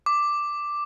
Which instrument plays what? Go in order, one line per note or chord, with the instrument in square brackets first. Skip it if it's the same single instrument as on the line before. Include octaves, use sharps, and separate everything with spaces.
[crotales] D6